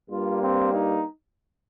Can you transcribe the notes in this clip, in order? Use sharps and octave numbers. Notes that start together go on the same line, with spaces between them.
G2 G3 A#3 F4
C4
D#4